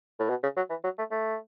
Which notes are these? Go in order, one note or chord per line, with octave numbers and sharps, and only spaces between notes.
A2
B2
C#3
F#3
E3
F#3
A3
A3